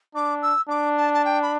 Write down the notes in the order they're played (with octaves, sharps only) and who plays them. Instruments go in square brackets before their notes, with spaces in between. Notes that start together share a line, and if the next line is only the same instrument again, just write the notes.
[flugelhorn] D4 [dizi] D6
[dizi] E6
[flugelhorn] D4 [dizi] D6
[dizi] A5
A5
G5
B5